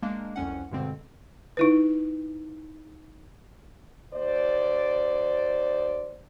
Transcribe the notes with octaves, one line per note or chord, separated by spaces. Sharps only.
G#3 A#3 D4
C2 F2 C#4 F#5
G2 B2 D3 G#3 C4
D#4 E4 B4
D#2 C5 D5